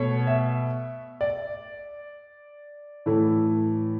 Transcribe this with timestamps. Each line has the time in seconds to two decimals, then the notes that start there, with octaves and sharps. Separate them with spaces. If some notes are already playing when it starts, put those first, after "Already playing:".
Already playing: B2 A3 C#5
0.27 E5
1.21 D5
3.06 A2 E3 A3